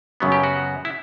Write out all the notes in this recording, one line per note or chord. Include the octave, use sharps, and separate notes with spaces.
F#2 C#3 F#3 B3
G4
F#4
E4